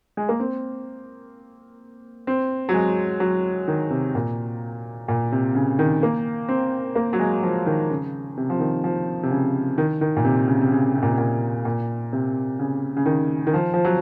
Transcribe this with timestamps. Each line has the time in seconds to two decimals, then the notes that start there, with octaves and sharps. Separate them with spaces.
0.17 G#3
0.29 A#3
0.40 C4
2.27 C4
2.69 F#3
2.74 G#3
3.20 F#3
3.68 D#3
3.90 C3
4.15 A#2
5.08 A#2
5.32 C3
5.55 C#3
5.79 D#3
6.03 A#3
6.49 C4
6.95 A#3
7.13 F#3
7.19 G#3
7.43 F3
7.66 D#3
7.90 C#3
8.37 C3
8.50 F3
8.60 D#3
8.84 F3
9.23 C3
9.31 C#3
9.78 D#3
10.01 D#3
10.17 A#2
10.25 C3
10.48 C#3
10.61 C3
10.71 C#3
10.96 C3
11.03 A#2
11.10 C3
11.18 A#2
11.65 A#2
12.13 C3
12.59 C#3
12.97 C#3
13.06 D#3
13.47 D#3
13.54 F3
13.74 F3
13.84 F#3